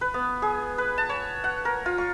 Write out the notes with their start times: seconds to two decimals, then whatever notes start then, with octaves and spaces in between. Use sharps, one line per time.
0.01 B4
0.14 B3
0.42 G#4
0.78 B4
0.98 A5
1.09 C#5
1.44 F#5
1.65 A#4
1.86 F4
1.98 C#6